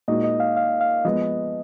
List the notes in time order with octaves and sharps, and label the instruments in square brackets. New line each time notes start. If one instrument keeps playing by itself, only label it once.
[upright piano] A#2 G#3 D#4 F#4 [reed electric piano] D#5
[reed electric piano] D#5
F5
F5
F5
[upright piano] F3 G#3 B3 [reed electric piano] D#5